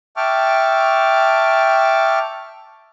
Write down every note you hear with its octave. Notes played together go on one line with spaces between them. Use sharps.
E5 G5 A5 C#6 D6 F6